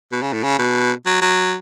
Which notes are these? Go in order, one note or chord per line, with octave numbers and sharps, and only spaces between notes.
B2
C#3
A2
C#3
B2
F#3
F#3